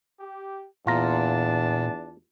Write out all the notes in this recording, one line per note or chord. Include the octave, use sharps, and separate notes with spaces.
G4
E2 A#2 D4 F4 A5 A#5